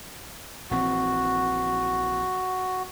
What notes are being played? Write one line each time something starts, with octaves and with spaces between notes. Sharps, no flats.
A#1 E3 C4 F#4